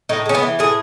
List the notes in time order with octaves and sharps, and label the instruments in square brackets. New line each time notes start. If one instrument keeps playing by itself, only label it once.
[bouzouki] A2 D#4
G#3 C#4
B3
E3
A2 G#4